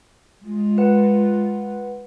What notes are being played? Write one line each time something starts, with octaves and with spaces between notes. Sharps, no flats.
G#3 F4
B4 F#5